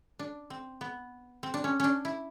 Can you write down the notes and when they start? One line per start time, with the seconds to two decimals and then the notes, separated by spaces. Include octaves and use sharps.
0.19 D4
0.50 C4
0.81 B3
1.43 C4
1.54 D4
1.64 C#4
1.80 C#4 D4
2.05 E4